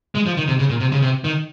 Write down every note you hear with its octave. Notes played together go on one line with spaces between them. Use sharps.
G#3
F3
D#3
C3
C#3
A#2
C3
C#3
C3
D#3